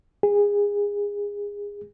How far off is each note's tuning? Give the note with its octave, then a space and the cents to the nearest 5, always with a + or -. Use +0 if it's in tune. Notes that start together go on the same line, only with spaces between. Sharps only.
G#4 -25